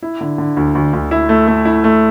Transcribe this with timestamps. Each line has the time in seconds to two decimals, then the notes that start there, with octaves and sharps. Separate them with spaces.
0.03 E4
0.21 D3
0.38 D3
0.57 D2
0.75 D2
0.93 D2
1.11 E4
1.29 A3
1.48 A3
1.65 E4
1.84 A3